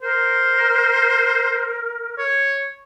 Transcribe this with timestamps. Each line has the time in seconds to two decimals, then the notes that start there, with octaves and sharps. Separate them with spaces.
0.02 A#4 C5
2.18 C#5